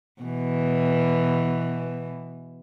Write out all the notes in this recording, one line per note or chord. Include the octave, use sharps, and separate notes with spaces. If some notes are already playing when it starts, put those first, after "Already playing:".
B2 E3